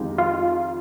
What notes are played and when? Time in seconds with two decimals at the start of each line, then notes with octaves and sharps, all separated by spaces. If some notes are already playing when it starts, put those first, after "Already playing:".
Already playing: F2 D#3 G#3 D#4 G4
0.18 F4